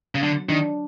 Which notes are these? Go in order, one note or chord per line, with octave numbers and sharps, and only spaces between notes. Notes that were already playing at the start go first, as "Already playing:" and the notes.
C#3
D3 F#3
D#3 D4